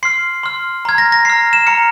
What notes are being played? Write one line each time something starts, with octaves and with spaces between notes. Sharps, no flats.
C6 F6 C7
C6 F6
A#5 F6 G#6
A#6
A#6
A#5 F6 C7
E7
A#5 F6 C#7